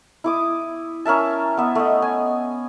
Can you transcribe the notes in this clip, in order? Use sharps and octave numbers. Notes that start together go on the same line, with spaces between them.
E4 D6 D#6
C#4 A#4 E5 A5
B3 E5
A3 D#5
G#5